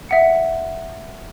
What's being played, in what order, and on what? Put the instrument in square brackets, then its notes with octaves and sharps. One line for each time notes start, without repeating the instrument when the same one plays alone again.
[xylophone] E5 F#5 C#7